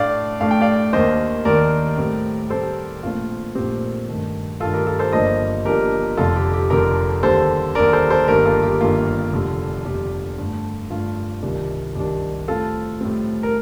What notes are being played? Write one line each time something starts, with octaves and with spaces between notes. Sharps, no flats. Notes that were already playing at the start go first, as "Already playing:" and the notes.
Already playing: A2 A3 D4 D5 F5
A2 A3 D4 F5
G5
D5 F5
D#2 D#3 A#3 D4 C5 D#5
D#2 D#3 A#3 D4 A#4 D5
A2 G3 C4
A2 G3 C4 A4 C5
A#1 A#2 A3 C4 F4
A#1 A#2 A3 C4 G4
G2 D#3 A3
G2 D#3 A3 F4 A4
G4 A#4
F4 A4
A4 C5
G1 G2 F3 A#3 D4 C5 D#5
G1 G2 F3 A#3 D4 G4 A#4
F1 F2 D3 F4 A4
G4
G4
F1 F2 D3 G4 A#4
D#2 D3 G3 A4 C5
D#2 D3 G3 A#4 D5
A4 C5
A4 C5
G1 G2 D#3 A#3 G4 A#4
F4 A4
G4
G1 G2 D#3 A#3 F4
F1 F2 D3 G3
F1 F2 D3 G3 G4
G2 D3 A3
G2 D3 A3 F4
C2 C3 D#3 G3 D4
C2 C3 D#3 G3 D4 G4
A2 G3 C4 F4 A4
A2 G3 C4
A#4